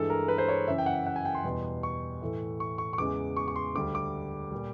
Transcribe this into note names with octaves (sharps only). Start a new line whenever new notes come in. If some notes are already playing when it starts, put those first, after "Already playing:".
Already playing: G2 E3 G#3 A4
A#4
B4
C5
C#5
F#2 C#3 E3 E5
G5
F#5
F#5
G#5
G5
C6
E2 B2 G3
C#6
A2 E3 A3
C#6
C#6
C#6
E2 C#3 E3 G#3 D6
C#6
C#6
C6
D2 D3 G3 D6
D6
A#2 G3